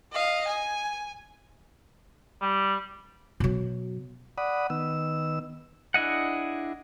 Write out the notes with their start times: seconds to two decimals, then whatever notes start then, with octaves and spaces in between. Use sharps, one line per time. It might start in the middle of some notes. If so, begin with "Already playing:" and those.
0.12 D#5 F5
0.48 G#5
2.42 G3
3.40 B2 F#3
4.38 D5 F#5 B5 D#6
4.70 D#3 B3 E6
5.94 D4 E4 G#4 D#5 F#5